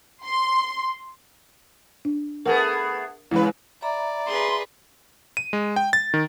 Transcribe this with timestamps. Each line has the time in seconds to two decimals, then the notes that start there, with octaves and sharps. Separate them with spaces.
0.24 C6
2.05 D4
2.46 A3 B3 G#4 A#4 F#5
3.31 E2 C#3 G#3 E4 B4
3.82 D5 E5 A#5 B5
4.27 G#4 B4 C6
5.37 D#7
5.53 G#3
5.76 G5
5.93 A6
6.14 D#3